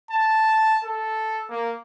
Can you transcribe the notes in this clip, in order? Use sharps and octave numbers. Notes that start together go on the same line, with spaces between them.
A5
A4
A#3